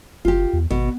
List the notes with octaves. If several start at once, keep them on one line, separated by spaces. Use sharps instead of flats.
F#1 F4 G4
E2
G#1 B2